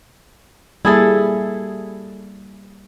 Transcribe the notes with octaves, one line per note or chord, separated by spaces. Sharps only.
G3 A#3 E4 G#4 A4 E5